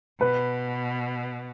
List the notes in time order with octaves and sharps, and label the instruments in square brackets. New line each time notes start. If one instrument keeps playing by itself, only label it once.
[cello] B2 [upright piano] B4